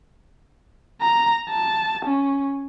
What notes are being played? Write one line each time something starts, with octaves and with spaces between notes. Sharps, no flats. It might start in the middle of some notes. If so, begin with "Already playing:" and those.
A#5
A5
C#4